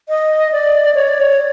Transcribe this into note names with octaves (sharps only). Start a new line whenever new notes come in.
D#5
D5
C#5
D5
C#5